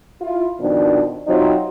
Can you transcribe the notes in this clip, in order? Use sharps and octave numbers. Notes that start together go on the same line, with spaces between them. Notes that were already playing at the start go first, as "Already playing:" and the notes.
E4 F4
F2 B2 D#3 D4
C3 F#3 C4 D#4 F4